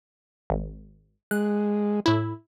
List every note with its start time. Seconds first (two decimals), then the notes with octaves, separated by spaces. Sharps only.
0.50 G#1
1.31 G#3 F#6
2.06 A2 E4